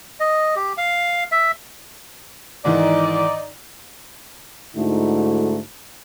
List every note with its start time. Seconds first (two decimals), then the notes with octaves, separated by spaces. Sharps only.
0.20 D#5
0.56 G4
0.78 F5
1.32 E5
2.65 G#2 D#3 E3 D#4 D5
4.76 G#2 D3 A3 D#4 E4 F#4